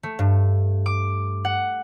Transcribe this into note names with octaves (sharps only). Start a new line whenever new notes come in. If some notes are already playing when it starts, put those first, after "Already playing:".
A3
G2
D6
F#5